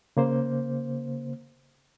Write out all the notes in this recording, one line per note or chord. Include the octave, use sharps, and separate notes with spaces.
C#3 A#3 C5